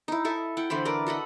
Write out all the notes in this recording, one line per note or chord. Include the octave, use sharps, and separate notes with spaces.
D#4 E4
E4 A4 E5 G#5
E4 F#5 G5
D3 E3 C5 B5
A#4 B4 D5 A#5
F#4 A4 D#5 B5